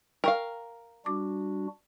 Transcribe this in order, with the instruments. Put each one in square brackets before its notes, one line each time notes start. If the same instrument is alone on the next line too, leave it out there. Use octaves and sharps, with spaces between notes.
[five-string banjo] A#4 F5 [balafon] G5 C#6
[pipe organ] G3 D4 F#4 [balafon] D6